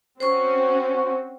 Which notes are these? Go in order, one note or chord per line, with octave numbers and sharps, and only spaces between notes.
C4 C#4 F#4 C5 C#6